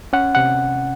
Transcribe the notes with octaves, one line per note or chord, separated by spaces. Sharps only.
C#4 F#5
C3 F#5